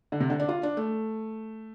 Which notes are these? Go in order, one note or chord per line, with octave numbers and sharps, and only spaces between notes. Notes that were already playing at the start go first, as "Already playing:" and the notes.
D3
C3
D3
D4
F4
D4
A3